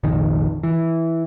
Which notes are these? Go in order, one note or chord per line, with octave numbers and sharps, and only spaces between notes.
F1 A#1 D#3
E3